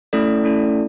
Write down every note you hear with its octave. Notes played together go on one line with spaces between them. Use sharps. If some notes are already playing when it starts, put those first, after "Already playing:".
A3 C#4 E4 A4 D5
A3 C#4 E4 A4 D5